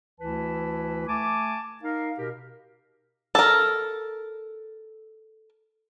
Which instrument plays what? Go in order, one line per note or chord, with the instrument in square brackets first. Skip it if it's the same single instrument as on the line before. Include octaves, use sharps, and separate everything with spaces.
[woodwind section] D2 E3 E4 B4 A5
A3 G#5 A5 D6
D#4 A#4 F5
B2 G4 A#4
[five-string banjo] A4 A#4